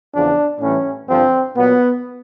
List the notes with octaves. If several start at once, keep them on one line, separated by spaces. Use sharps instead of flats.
E2 C#3 F3 D4
A2 E3 G3 C#4
G2 D3 F3 C4
A#2 F#3 B3